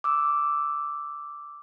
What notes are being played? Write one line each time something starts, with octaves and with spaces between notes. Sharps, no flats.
D6 E6